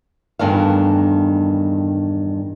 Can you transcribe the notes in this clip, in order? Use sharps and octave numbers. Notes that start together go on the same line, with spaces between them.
E2 G2 D#3 A3 F5